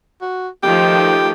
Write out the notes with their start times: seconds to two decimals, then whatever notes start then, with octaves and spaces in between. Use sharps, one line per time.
0.21 F#4
0.63 D#3 F3 A3 G4